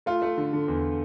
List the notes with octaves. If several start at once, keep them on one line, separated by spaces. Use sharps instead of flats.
A3 F4
A3
D3
D3
E2